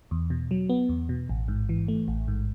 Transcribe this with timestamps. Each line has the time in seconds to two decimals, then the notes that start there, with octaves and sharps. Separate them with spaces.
0.11 E2
0.30 B2
0.51 F#3
0.69 B3
0.89 E2
1.09 B2
1.29 A1
1.48 G#2
1.69 E3
1.88 A3
2.08 A1
2.28 G#2